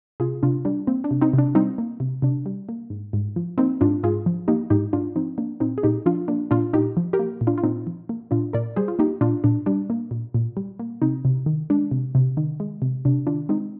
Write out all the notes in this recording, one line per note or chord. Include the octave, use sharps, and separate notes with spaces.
C3 F4 G#4
C3 D4 F4
G3 D4
A#3 C4
D4
C3
C4 D#4
C3 D4
G3 C4 D#4
A#3
C3
C3 D4
G3
A#3
G#2
G#2
F3
A#3 C4 D#4
G#2 D4 F4
G#2 F4 G#4
F3
A#3 D#4 G4
G#2 D#4 G4
G#2 D4 F4
F3 C4 D#4
A#3 D4
A#2 C4 D#4
G#4
A#2 D#4 G4
F3 D4 F4
A#3 D4
A#2 D4 F4
A#2 D#4 G4
F3
G4 A#4
A#3
A#2
D4 F4
F4
A#2 C4 D#4
F3
A#3
A#2 D4 F4
A#2 A#4 D5
G3 G#4 C5
F4
A#3 D#4 G4
A#2 D4 F4
A#2 D4
G3 D4
A#3
A#2
A#2
G3
A#3
C3 C4 D#4
C3
D#3
G#3 D4
C3
C3
D#3
G#3
C3
C3 D4
D#3 D4 F4
G#3 C4 D#4